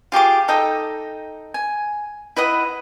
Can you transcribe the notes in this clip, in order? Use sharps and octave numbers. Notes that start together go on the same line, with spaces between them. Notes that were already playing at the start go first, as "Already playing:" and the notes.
F4 G4 G#4 D6
D#4 A4 D#5 G5
G#5
E4 B4 D#5 F#5